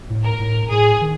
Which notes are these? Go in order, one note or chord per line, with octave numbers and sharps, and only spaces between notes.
A2
A#4
A2
A2 G#4
D#3